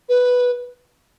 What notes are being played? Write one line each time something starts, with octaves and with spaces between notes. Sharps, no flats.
B4